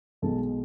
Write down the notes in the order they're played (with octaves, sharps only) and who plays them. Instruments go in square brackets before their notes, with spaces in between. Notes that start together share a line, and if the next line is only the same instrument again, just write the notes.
[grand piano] B1 B2 G#3 A4